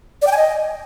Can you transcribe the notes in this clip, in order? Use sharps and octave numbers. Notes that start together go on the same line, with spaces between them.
D5
G5
G#5
D#5